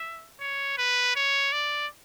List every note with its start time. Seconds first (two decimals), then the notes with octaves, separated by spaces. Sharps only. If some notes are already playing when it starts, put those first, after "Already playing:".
Already playing: E5
0.40 C#5
0.77 B4
1.16 C#5
1.53 D5